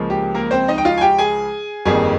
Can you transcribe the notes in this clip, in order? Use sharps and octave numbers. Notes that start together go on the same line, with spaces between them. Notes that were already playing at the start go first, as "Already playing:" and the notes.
Already playing: C#2 C#3 F3 A#3
G4
A#3 A#4
C4 C5
D#4 D#5
G5
F4 F5
G#5
G4 G5
G#4 G#5
G1 F2 D#3 G3 A#3 G#4 G#5